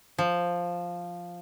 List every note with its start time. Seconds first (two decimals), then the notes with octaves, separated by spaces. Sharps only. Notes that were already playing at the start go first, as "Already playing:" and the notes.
0.18 F3